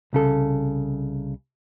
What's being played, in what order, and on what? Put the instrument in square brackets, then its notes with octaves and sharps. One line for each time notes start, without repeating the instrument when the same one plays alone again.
[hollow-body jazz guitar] C2 C#3 A4